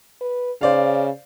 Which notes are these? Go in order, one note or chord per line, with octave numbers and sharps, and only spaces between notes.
B4
C#3 C5 D5 F5